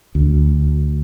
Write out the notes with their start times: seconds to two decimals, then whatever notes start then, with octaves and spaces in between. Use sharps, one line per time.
0.15 D2